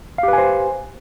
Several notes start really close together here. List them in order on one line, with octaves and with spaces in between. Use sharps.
F5 G4 B4 G#5 C5